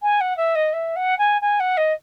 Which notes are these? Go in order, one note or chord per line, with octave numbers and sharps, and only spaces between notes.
G#5
F#5
E5
D#5
E5
F#5
G#5
G#5
F#5
D#5